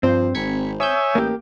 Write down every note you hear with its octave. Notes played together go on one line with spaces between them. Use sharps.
G2 F3 C4 C5
G#1 G#6 B6 C#7
C#5 E5 G#5 D#6 E6 G6
A1 A#3 G4